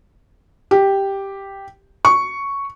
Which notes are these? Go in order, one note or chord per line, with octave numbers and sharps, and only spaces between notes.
G4
C#6